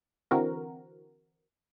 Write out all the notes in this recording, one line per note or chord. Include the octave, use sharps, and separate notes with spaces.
D3 E3 C4 F#4 A#4